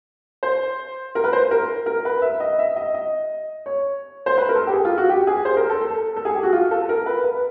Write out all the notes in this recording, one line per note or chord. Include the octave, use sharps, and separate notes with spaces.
C5
A#4
B4
C5
A#4
A#4
B4
E5
D#5
E5
D#5
D#5
C#5
C5
B4
A#4
A4
G4
G#4
F4
F#4
G4
G#4
C5
A#4
A4
A4
A4
G#4
G4
F#4
F4
A4
A#4
B4
B4